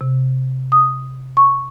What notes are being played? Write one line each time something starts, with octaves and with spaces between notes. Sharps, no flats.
C3
D#6
C#6